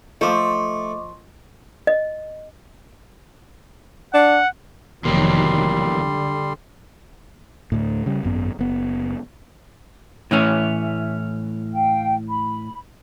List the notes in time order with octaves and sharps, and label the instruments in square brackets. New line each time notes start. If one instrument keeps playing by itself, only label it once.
[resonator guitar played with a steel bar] F3 C5 [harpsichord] A3 [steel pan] F4 A4 [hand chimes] D#5 C#6 D6
[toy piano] D#5
[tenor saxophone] D4 [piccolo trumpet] F#5
[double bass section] F1 D#3 F#3 [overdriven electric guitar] E2 A#3 [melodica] G3 C6
[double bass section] D3
[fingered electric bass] D2 A2
C#3 G3
G#1 F#2 B3
F#1 B3
[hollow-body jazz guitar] A2 E3 C#4 [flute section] E5
[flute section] F5 G5
B5